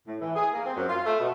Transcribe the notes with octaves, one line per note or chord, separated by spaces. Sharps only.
A2
E3
G#4
A#3
C4
F#2
F4
A3
B2